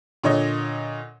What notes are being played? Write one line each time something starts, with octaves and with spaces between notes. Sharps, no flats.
A#2 D3 C#5 D#5